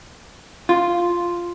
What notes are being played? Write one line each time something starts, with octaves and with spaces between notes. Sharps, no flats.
F4